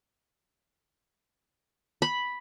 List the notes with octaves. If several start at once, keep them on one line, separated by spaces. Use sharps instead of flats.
B5